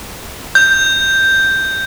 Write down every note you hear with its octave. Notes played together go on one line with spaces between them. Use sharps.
G6